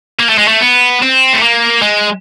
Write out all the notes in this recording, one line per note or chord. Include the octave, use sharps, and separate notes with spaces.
A#3
A3
G#3
A3
B3
C4
A3
A#3
G#3